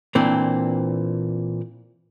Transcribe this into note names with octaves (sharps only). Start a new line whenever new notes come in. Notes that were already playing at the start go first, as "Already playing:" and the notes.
A#2 E3 C4 D4